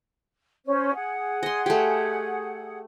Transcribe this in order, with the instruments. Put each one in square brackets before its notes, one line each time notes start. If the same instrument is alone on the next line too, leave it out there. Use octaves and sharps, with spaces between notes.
[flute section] C#4 C5
G#4 F#5
[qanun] D#5 C6
A3 G4